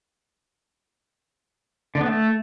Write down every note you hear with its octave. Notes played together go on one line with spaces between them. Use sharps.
D3
B3
A3